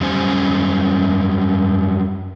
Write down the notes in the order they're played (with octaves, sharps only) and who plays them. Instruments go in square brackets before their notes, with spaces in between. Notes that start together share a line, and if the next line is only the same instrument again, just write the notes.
[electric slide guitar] F#2 G3 C#4 C5 G#5